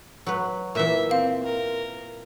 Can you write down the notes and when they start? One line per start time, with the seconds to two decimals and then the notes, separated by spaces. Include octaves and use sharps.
0.26 F#3 B4
0.75 A#2 E3 E5
1.11 C4 F5
1.44 A#4